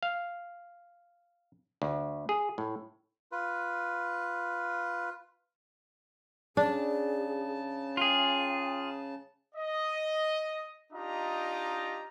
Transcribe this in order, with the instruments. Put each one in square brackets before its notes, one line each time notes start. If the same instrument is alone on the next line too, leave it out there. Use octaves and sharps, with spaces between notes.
[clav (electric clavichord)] F5
D2
G#4
A2
[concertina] F4 B4
[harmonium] C#3 A5 [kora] D4 [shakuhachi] G#4
[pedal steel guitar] F4 G#4 [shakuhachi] G5
[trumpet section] D#5
D4 D#4 F4 G4 D#5 A#5